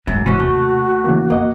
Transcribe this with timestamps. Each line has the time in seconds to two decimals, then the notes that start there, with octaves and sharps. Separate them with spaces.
0.07 G#1 F#2 G3
0.26 G#2 C3 E3 C#4 E4 F#4
0.39 D#2 A3
1.04 C#3 E3 A#3
1.30 F2 A#3 D#5 F#5